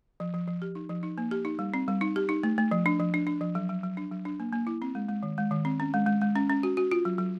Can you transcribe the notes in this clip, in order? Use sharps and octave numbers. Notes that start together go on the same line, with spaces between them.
F3
F3
F3
G4
D#4
F3
D#4
A#3
G4
D#4
G3
C4
G3
D#4
G4
D#4
A3
A3
F3
D4
F3
D4
D4
F3
F#3
F#3
F#3
D4
F#3
D4
A#3
A#3
E4
C4
G#3
G#3
D#3
G#3
D#3
C4
C#4
G#3
G#3
G#3
C#4
C#4
F#4
F#4
F4
F#3
F#3